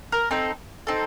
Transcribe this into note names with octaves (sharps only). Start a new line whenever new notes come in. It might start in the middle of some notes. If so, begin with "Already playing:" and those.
A#4
C4 D#4 A4
C4 D#4 A4